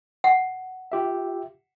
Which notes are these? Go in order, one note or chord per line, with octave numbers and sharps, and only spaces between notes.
F#5
F4 G4 E5